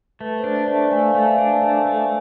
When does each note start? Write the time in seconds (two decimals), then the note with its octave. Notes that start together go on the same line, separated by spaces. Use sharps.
0.20 A3 B4
0.38 C5
0.44 D4
0.56 D5
0.68 A3
0.73 E5
0.91 A3 G#5
1.00 F5
1.10 E5
1.15 A3 F5
1.38 D4
1.62 A3
1.85 A3